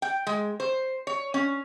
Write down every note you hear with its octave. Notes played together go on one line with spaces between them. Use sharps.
G5
G#3
C5
C#5
C#4